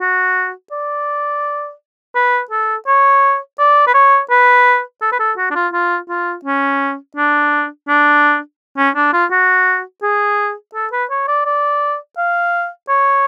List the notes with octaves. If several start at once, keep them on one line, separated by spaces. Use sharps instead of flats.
F#4
D5
B4
A4
C#5
D5
B4
C#5
B4
A4
B4
A4
F#4
D4
F4
F4
F4
C#4
D4
D4
C#4
D4
F4
F#4
G#4
A4
B4
C#5
D5
D5
F5
C#5